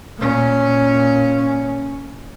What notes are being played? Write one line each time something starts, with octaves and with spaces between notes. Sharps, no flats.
A#2 C#4